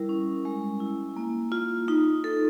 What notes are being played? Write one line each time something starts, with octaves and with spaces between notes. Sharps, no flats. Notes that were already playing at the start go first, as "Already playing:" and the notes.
Already playing: G3 E4 A#4
C#4
G#3
E4
A#3
F4
D#4
A4